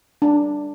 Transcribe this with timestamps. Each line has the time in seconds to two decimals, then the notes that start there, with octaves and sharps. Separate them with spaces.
0.22 D4